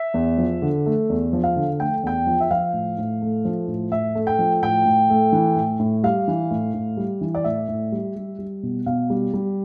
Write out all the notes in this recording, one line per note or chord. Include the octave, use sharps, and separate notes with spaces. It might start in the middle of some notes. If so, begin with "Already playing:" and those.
Already playing: E5
E2
F3
D3
A3
E2
F3
F5
D3
A3 G5
E2 G5
F3
E5
F3 F5
A2
A2
A3
F3
A2
A2 E5
A3
G5
F3
A2 G5
A2
A3
E3
A2
A2
G3 F5
E3
A2
A2
G3
E3
D5
A2 E5
A2
G3
G3
G3
B2
B2 F5
G3
G3